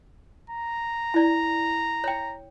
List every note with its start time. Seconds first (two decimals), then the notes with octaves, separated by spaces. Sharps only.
0.50 A#5
1.14 E4 D5
2.04 C#5 G5